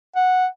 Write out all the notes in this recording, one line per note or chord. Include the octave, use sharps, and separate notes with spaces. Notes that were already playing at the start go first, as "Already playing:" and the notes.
F#5